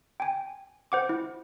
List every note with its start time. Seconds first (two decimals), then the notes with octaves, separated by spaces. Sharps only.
0.20 G5 G#5
0.92 C5 F#5 D6
1.09 E4